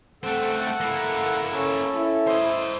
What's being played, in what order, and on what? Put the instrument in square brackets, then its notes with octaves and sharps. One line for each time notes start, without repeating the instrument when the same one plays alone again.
[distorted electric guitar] A3 C4 [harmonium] A4 F#5
[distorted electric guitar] A#3 E4
[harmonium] C#4 A4
[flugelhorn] E4
[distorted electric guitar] C5 D#5